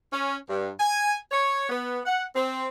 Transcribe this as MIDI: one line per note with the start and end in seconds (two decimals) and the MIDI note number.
0.11 0.35 61
0.48 0.69 43
0.80 1.16 80
1.31 1.68 73
1.69 2.00 59
2.05 2.23 78
2.35 2.67 60